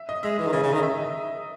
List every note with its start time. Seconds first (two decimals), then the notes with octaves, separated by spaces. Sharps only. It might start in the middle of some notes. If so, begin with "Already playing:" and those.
Already playing: E5
0.09 D#5
0.23 G#3 E5
0.38 E3 D#5
0.47 D#3
0.53 C#3 D#5
0.63 C#3
0.68 D#5
0.73 D#3
0.78 D#5
0.83 E5
0.98 D#5